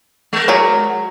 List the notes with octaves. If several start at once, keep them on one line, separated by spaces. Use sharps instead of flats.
G#3 A#4
F#3 G#4 D5